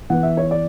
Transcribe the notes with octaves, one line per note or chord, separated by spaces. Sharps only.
E3 B3 F#5
E5
C#5
D5